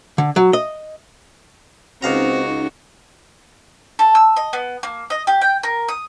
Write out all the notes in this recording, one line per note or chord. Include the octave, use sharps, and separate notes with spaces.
D3
F#3
D#5
C#2 C4 C#4 D#4 F#4 F5 A#5
A4
E6
D#5
B3
A#3
D#5
G4
G5
A#4
D#6